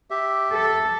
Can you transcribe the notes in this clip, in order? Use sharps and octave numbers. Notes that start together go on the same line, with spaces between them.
G4 E5
A4